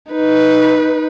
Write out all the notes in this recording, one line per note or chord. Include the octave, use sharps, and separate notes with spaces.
D#4 B4